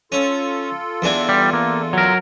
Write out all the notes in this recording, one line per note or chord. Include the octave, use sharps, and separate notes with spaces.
C#4 F4 A4
E2 D4 G#5
G3
A#3
F#3 A#4